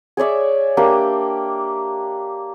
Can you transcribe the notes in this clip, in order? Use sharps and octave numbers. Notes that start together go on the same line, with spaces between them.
G#4 C#5 D5 E5
A#3 D4 G4